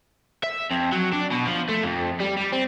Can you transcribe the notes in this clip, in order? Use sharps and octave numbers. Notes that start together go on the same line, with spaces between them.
E5
F2
F#3
D4
B2
F3
A3
F2
G3
G3
C4